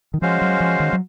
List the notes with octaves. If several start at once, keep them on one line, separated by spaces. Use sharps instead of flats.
D#3
F3 G#3 C#4 F#4 C5 F5
F#3
F3
D#3
F#3